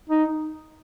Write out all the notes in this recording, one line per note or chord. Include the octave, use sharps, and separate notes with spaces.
D#4